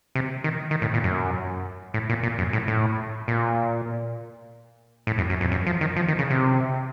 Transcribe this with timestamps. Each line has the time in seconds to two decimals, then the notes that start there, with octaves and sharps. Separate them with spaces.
0.15 C3
0.44 D#3
0.71 D#3
0.82 A2
0.94 A#2
1.04 F#2
1.94 A2
2.10 A#2
2.23 A#2
2.39 F#2
2.53 A2
2.68 A2
3.28 A#2
5.07 A2
5.18 F#2
5.30 F#2
5.41 F2
5.52 F#2
5.67 F3
5.81 D#3
5.96 F3
6.08 D#3
6.19 C#3
6.30 C3